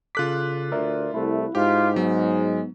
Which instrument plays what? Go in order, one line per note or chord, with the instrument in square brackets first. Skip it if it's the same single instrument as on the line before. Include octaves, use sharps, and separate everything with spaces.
[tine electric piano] C#3 A4 D6 [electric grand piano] F4 F#6 B6
[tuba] D2 [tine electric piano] A#4 D5 E5
[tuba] C2 [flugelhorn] A3 [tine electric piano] E4
[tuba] G#2 [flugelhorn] F4 [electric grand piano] G4
[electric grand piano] F#3 [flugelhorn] G#3 [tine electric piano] B3